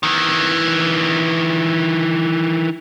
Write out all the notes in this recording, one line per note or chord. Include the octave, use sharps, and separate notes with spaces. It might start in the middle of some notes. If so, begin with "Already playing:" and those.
D#3 E3